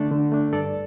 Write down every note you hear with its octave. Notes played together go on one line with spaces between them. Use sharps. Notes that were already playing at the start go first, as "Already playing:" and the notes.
Already playing: D3 A3 D4 A4 D5
D3
A3 D4
G2 A4 D5